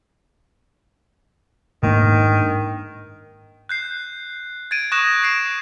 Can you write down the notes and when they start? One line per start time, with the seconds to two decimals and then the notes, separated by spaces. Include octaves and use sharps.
1.83 G#2 D#3 A#3 D4
3.69 F#6 G6 C7
4.71 G#6 A6 D7 D#7
4.92 C#6 D#6 F#6 A6 A#6 E7
5.22 F#6 C7 D7